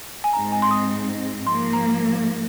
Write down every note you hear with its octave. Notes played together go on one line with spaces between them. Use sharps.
G#5
G#2 G#3 C4 D#4 A#5
G#5
C6
D#6
G#2 F3 A#3 C6
A#5